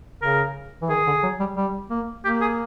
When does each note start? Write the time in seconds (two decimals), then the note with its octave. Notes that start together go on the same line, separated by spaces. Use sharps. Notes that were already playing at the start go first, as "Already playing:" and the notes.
0.22 C#3 A#4
0.82 E3
0.89 D#3 G#4
1.07 D3
1.23 F#3
1.40 G3
1.57 G3
1.90 A#3
2.24 A#3 G4
2.41 G#4